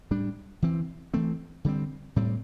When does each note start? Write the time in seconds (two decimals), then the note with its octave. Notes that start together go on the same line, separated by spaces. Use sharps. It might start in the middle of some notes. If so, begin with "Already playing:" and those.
0.11 A2 G3 D4
0.62 E3 C4
1.14 E3 A3 C4
1.65 D3 G3 C4
2.16 A2 G3 C4